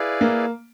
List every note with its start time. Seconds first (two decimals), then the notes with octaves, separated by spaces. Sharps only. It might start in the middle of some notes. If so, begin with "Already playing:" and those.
Already playing: E4 G#4 B4 D5 F5
0.21 A#3